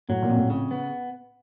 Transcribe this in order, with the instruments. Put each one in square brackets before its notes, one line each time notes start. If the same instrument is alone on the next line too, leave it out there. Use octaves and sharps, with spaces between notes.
[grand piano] A2 [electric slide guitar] F#3
[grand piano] A#2
[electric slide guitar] F2
[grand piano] A2
[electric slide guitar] C#3
B3